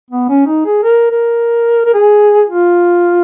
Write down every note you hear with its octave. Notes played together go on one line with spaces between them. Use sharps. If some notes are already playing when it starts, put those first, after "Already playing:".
B3
C#4
D#4
G#4
A#4
A#4
A#4
G#4
F4